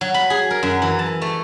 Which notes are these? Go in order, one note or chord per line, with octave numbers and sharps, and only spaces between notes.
F#3
B5
G#4
A#4
F#2
E3
A5
A3